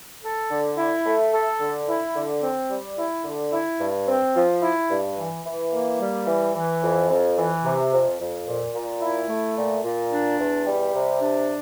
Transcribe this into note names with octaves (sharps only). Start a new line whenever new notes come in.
A4
D3
E4
A3
A4
D3
E4
D3
C4
G3
E4
D3
E4
G2
C4
F3
E4
G2
E3
E3
A#3
G3
E3
E3
F2
F2
E3
C3
F2
F2
A#2
A#2
E4
A3
A#2
A#2
D4
E2
G3
C3
D4